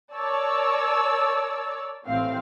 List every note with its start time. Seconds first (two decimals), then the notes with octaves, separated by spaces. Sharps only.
0.14 A#4 C#5 D5 A5 E6
2.05 A1 A2 C4 F5